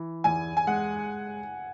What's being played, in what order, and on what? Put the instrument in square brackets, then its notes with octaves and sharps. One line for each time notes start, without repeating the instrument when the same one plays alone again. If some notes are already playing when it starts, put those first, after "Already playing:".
Already playing: [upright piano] E3
[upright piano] E2 [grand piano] G#5
[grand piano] G#5
[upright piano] G#3 [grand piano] F#5